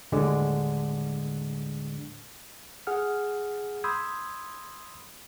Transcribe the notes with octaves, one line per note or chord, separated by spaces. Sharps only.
D#2 A2 D3 G#3 D4
G#4 F#5 F6
B5 C6 D#6 E6 G6 G#6